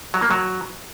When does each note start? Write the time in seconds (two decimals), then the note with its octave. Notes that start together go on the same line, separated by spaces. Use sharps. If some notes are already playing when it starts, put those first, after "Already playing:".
0.14 F#3
0.22 A#3
0.31 F#3